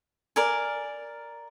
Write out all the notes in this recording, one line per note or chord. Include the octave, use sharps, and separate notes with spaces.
A#4 D5 G#5